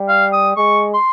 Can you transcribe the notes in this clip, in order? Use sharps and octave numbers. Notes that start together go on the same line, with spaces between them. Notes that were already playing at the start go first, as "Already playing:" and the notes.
Already playing: G3
F5
D#6
G#3 C#6
C6